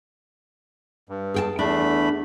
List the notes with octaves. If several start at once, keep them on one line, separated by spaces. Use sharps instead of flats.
G2
G#4 G5 A5
E2 A3 D4 B5